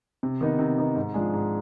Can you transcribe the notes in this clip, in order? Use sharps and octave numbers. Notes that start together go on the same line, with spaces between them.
C3
D#3 B3 D#4
C3
D#3 B3 D#4
G#2
F3 G#3 D4 G#4
G#2